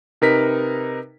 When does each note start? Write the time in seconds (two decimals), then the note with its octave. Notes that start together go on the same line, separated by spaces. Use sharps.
0.22 C3 D#4 A#4 B4 B6